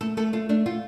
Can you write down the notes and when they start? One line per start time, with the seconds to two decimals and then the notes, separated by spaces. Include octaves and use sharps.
0.01 A3 A4
0.17 A3 A4
0.33 A3 F4
0.49 A3 D4
0.66 A3 F4